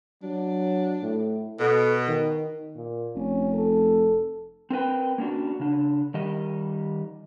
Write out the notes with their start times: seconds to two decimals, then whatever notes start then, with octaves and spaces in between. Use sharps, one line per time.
0.23 F#3 D4
1.03 A2
1.60 B2 A4
2.08 D#3
2.76 A#2
3.15 F1 C#4
3.54 A4
4.70 C4 A#4 B4 G5
5.18 A#3 C#4 D4 F#4
5.60 C#3 D4
6.14 D#3 G3 D#5